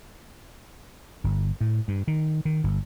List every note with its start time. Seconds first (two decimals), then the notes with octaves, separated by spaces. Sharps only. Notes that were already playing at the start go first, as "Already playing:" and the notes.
1.24 G1
1.61 A2
1.88 G2
2.08 D#3
2.45 D#3
2.64 G1